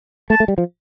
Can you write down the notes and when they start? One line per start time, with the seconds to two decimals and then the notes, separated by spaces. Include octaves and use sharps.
0.30 A3 A5
0.40 A3
0.48 G3
0.58 F3